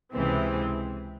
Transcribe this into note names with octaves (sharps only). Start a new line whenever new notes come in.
C#2 C3 E3 G#3 C4